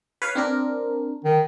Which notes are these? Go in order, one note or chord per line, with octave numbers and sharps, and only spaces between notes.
B4 C#5 F5
C4 D4 A#4
D#3